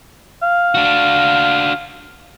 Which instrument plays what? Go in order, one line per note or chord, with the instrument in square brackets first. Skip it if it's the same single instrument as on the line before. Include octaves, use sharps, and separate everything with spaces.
[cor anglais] F5
[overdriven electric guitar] D4 F#4